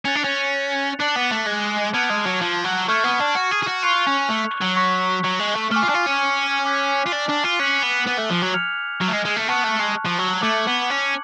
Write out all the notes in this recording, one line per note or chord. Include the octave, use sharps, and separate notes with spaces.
C#4 F#6 A6 C#7 F7
D4
C#4
D4 D6 F#6 A6 C#7 F#7
B3
A3
G#3
B3 A5 F6 G#6 D7 F7
G#3
F#3
F3
F#3
A3 C#6 F6 G#6
B3
D4
F#4
G#4
G#4
F#4
F4 C#6 F#6 C#7 F7
C#4
A3
F#3
C#6 F#6 B6
F#3
G#3
A3
A3 G#5 D6 F6
F4
D4
F4
C#4
G#5 D6 F#6 B6
F4
D4
D4
F4
C#4 F#6 B6 F#7
B3
B3
A3
F3
F#3
F6 G#6 C#7 F7
F#3
A3
G#3
G#3
A3
B3 A5 C#6 F#6
A3
G#3
F3
F#3
A3 D6 G#6 C#7 F#7
B3
C#4